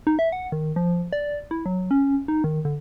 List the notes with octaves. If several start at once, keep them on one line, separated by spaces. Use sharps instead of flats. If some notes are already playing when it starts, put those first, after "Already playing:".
D#4
E5
F#5
D#3
F3
D5
E4
F#3
C#4
D#4
D#3
D3